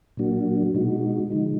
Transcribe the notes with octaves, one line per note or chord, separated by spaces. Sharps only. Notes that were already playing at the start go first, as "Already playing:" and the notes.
A#2 F#3 A#3 D4 F#4
B2 G#3 D#4 F#4
D3 F3 G#3 D#4